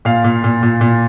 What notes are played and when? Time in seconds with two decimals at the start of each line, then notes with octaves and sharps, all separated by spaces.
0.05 A#2 F5
0.24 A#2
0.44 A#2
0.63 A#2
0.81 A#2